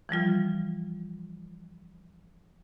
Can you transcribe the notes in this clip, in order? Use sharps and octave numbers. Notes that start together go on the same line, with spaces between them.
E3 F3 G3 F4